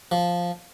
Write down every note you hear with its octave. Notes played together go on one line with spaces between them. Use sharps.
F3